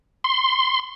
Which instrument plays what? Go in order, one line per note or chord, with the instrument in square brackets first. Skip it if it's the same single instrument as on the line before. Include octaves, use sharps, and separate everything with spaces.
[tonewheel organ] C6